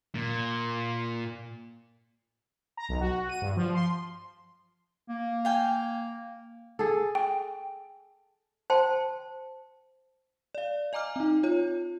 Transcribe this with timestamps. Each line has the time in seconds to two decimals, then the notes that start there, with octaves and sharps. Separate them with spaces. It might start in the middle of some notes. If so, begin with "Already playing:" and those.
0.15 A#2
2.77 A#5
2.89 B1
3.01 F#4
3.29 D#7
3.42 G2
3.57 F3
3.74 C6
5.09 A#3
5.45 F5 G5 G#5
6.79 G#4 A4
7.15 G5
8.70 C5 G5 A5 C6
10.55 D5 F5
10.93 D#5 G#5 A#5 D6 F6
11.16 C4 D#4
11.43 F4 C#5